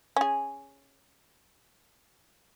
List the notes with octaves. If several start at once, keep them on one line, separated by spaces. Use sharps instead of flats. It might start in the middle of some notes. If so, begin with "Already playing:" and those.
C#4 G#4